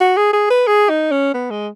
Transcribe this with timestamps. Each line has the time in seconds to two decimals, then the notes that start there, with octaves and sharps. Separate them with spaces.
0.01 F#4
0.17 G#4
0.33 G#4
0.50 B4
0.67 G#4
0.89 D#4
1.12 C#4
1.34 B3
1.51 G#3